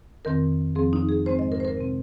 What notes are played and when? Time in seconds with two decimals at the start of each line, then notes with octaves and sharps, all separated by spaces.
0.25 F2 D#3 C4 A#4
0.75 F2 F3 C4 G#4
0.93 D#4
1.09 G#4
1.26 G#2 G#3 C4 C5
1.39 D#5
1.52 A#4
1.60 C5
1.65 A#4
1.77 C3 G#3 C4